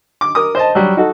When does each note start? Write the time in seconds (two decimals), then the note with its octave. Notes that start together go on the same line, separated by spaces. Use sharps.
0.21 D6
0.35 A#4 D6 D#6
0.55 C5 D#5 A5
0.75 F#3 G3
0.97 D#4 F#4 A4